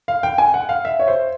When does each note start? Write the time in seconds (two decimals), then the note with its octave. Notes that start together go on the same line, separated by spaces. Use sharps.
0.08 F5
0.23 G5
0.38 G#5
0.54 F#5
0.69 F5
0.85 E5
0.99 C#5
1.08 C5